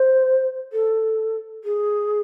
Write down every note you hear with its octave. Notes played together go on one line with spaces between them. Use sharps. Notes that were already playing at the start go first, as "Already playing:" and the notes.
Already playing: C5
A4
G#4